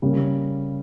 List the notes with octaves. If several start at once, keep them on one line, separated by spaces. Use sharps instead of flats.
C#3 G3 A#3